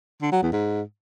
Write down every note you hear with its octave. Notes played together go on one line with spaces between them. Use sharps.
D3
F#3
E2
G#2